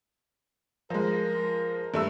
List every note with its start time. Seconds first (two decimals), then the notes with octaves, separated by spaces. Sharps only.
0.90 F3 G#3 A#4
1.94 G2 A3 E6